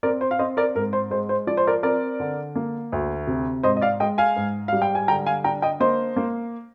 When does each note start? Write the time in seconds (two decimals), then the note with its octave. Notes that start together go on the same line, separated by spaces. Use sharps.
0.03 C4 A#4 D5
0.21 C5
0.31 F5
0.39 C4 C5 D#5
0.57 A#4 D5
0.75 G#2 A#4
0.93 C5
1.11 G#3 C5
1.29 C5
1.47 F3 D5
1.57 C5
1.67 A#4 D5
1.83 C4 A#4 D5
2.20 D3
2.56 A#3
2.92 D2
3.27 C3
3.63 G#2 C5 D#5
3.77 D#5
3.82 D5 F5
4.00 G#3 D#5 G5
4.18 F5 G#5
4.36 G#2
4.68 G3 F5
4.82 G5
4.95 G#5
5.08 D3 G5 A#5
5.26 F5 G#5
5.44 D4 G5 A#5
5.62 D#5 G5
5.80 A#3 C5 D#5
6.16 A#3